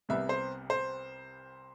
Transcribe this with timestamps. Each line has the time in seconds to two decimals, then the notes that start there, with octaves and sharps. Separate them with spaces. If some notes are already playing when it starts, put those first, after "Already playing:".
0.09 C2 C3 G3 B3 E5
0.29 C5
0.70 C5